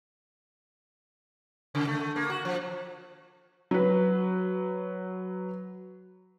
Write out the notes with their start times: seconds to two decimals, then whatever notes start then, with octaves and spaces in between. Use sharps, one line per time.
1.75 C#3
1.87 A3
2.00 A3
2.16 A#3
2.30 F#4
2.45 F3
3.71 F#3 B4